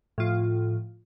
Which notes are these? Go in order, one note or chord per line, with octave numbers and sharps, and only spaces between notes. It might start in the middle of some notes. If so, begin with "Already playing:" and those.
A2 F3 F4